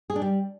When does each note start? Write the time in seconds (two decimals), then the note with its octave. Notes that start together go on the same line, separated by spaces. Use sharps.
0.10 G#4
0.16 D4
0.22 G3